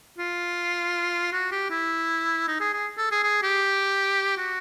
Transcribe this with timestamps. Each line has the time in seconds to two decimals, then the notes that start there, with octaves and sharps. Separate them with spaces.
0.18 F4
1.32 F#4
1.52 G4
1.71 E4
2.48 D#4
2.60 G#4
2.73 G#4
2.98 A4
3.12 G#4
3.23 G#4
3.43 G4
4.37 F#4